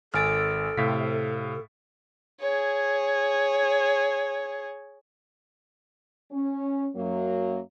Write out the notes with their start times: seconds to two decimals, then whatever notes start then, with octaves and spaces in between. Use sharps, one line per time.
0.14 G#1 A4 G#5 F6 A6 D7
0.77 A2 C3 F5 B6
2.40 G#4 C#5
6.32 C#4
6.96 F#2 F#3 A#3